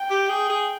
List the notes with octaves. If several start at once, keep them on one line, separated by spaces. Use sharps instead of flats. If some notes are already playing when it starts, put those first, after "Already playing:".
Already playing: G5
G4
G#4
G#4